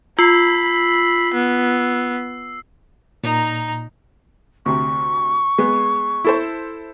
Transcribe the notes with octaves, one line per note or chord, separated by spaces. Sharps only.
F4 B5 E6 C7
B3
A#2 D#4 A#5
D2 C3 C#6
G#3 B3
E4 A4 C5